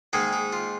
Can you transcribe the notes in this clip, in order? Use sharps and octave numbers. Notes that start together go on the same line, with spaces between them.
G#2 D#3 A#3 D#4 G#4
D#4
F4